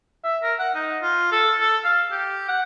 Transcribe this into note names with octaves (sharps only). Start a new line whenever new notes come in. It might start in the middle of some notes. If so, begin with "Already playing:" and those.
E5
A#4
F#5
D#4
F4
A4
A4
F5
G4
F#5